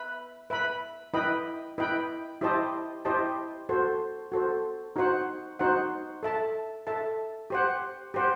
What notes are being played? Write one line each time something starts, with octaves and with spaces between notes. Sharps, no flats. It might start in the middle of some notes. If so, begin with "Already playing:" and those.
Already playing: B4 E5 B5
B4 E5 B5
E4 B4 D#5 G5 B5
E4 B4 D#5 G5 B5
E4 G4 C5 D#5 A5
E4 G4 C5 D#5 A5
F#4 A4 C5
F#4 A4 C5
D#4 F#4 C5 F#5
D#4 F#4 C5 F#5
A4 E5 A5
A4 E5 A5
G4 C5 F#5
G4 C5 F#5